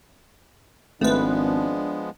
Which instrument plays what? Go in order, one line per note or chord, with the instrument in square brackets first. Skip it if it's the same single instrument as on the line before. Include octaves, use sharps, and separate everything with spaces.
[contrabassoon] G#1 [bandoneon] F3 G#3 B3 [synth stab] A3 B4 [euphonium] D4